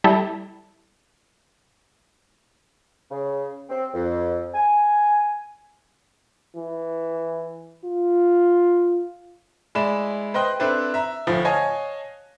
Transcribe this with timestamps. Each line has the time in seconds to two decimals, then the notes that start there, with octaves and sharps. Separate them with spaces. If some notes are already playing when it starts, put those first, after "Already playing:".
0.04 G3 E4 A4
3.10 C#3
3.69 C4
3.94 F2
4.54 G#5
6.56 E3
7.85 F4
9.75 G#3 E4 D5 B5 E7
10.34 B4 C5 D#5 G5 C6 F#6
10.60 C4 D4 E4 A4 B4 C5
10.94 E5 A#5
11.27 D2 A2 F3
11.45 C#5 D#5 F5 G#5 A5